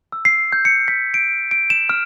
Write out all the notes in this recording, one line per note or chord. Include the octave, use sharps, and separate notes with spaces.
E6
C7
G6
C#7
B6
D7
D7
E7
F6